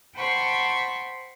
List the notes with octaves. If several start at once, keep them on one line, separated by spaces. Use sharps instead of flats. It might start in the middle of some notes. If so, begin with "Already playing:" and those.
C5 F#5 G5 A5 B5 C#6